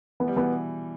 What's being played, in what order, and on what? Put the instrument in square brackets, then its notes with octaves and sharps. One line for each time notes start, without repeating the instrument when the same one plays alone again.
[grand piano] E3 [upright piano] B3
[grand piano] G3
[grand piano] B2 E3 [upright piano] B3